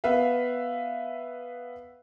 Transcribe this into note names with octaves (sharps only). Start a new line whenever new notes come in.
B3 B4 E5 F5